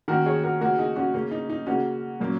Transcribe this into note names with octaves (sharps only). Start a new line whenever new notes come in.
D#3 A#3 C#4 F#4 A#4
G#4 C#5
F#4 A#4
C#3 A#3 C#4 F#4 A#4
D#4 G#4
C#4 F#4
C#3 A#3 C#4
D#4
D#4
C#3 A#3 C#4 F#4
A#2 F#3 A#3 C#4